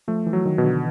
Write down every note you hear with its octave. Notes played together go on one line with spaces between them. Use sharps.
F3 A3
E3
F#3
D#3
B2
D3